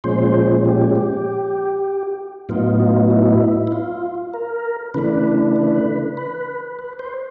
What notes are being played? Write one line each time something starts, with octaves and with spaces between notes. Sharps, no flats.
A#2 F3 G#3 C#4 C5
G4
G4
A2 F#3 B3 D#4 F4
F4
E4
E4
F4
A#4
C#3 E3 A3 D4 B4
B4
B4
B4
C5